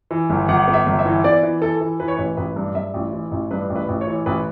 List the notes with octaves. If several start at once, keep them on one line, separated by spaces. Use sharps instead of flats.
E3
G1
G1 F#5
B3
E5
G1
E5
E3
B3 D5
E3
E3 A4
E3
E3 B4
C#5
A1 B4
A1 B4
G2
G2 E5
A1
E3
A1
G2 B4
A1
B4
A1
C#5
E3
A1 B4